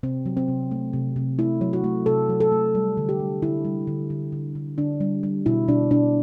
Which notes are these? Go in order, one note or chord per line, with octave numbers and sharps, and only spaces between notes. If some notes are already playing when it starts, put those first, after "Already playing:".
C3 C4
F#3
C4
C3
A3
C3
C3
A3 E4
F#3
F#4
A3
C3 A4
F#3
A4
A3
G3
D3
G4
G3
D3 E4
G3
D3
D3
D3
D3
D3 D4
G3
G3
B2 E4
B2 D4
B2 D4